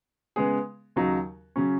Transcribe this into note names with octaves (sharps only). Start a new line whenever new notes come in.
C#3 G#3 B3 G#4
D#2 C#3 F#3 D#4
C#3 F#3 C#4